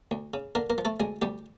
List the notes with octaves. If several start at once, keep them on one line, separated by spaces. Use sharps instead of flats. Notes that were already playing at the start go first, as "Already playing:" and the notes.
D2
C#3
D3 A#3 A#4
A#3 A#4
F3
A3 A4
D2 G#3 G#4
D2 G3 G4